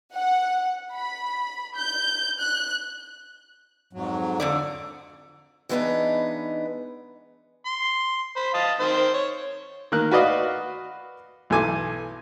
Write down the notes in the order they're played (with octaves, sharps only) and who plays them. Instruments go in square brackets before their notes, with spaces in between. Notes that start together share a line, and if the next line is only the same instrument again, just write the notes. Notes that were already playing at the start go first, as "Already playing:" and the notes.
[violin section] F#5
B5
G6
F#6
[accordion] F2 G#2 F#3
[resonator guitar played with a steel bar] F2 D3 D5
[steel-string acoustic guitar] E3 G#3 B3 D4 D#4
[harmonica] C6
C5 B5
D#5 F5 A5
D#3 C4 C5
C#5
[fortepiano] D#3 A#3 F#6
F#4 B4 D5 D#5 F5
B1 E3 A4 G#5 D6